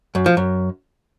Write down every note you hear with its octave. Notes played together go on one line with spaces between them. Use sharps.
F#2
F3
F#2